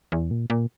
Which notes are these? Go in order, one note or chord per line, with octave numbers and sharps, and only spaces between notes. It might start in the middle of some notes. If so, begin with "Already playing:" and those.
E2
A#2
A#2